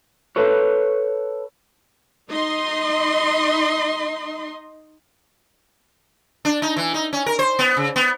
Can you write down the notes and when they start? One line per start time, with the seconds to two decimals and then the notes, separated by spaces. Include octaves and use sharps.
0.36 A4 B4 C#5
2.28 D#4 D#5 C6
6.45 D4
6.62 D#4
6.76 E3
6.94 D#4
7.13 C#4
7.26 A#4
7.39 C5
7.59 B3
7.77 C#3
7.96 B3